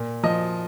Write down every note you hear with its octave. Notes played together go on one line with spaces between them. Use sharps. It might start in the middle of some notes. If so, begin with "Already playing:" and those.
Already playing: A#2
F3 D#5